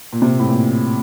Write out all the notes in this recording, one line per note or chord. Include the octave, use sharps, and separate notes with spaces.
A#2
C3
A2
A#2